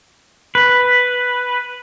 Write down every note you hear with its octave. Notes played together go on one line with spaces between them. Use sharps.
B4